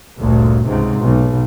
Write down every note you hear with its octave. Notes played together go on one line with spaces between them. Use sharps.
G1 D2 A#2
C#2 G#2 C3
B1